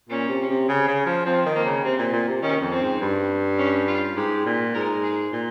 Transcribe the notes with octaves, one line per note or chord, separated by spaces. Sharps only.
A#2 C#4
C3
C3
C#3
C#3
F3
F3 C4
D#3
A#3
C#3
C3 C4
A#2
A#2
C3
D#3 C#4
F2
C4
G#2
G2
C#4
F4
G#2 G4
A#2
G#2 A#4
G#4
A#2